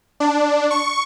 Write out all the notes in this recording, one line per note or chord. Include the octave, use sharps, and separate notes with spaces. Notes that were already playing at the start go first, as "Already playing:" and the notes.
D4
C#6